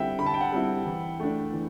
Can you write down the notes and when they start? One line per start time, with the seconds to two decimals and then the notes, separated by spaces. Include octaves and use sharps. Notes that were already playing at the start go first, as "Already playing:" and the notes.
Already playing: D3 G3 C4 E4 E5 F#5 G5
0.18 D3 B5
0.26 A5
0.34 G5
0.41 F#5 A5
0.52 G3 C4 E4
0.85 E3
1.20 A3 D4
1.53 E3